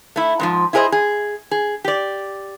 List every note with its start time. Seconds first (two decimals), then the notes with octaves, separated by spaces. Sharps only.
0.16 A3 E4
0.39 G#2 D#3 F3
0.73 E4 F4 G#4 A#4 C5 D#5
0.92 G#4
1.51 G#4
1.84 G4 D5